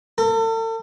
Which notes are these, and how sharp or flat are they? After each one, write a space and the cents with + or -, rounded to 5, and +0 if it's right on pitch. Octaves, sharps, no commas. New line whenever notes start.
A4 +40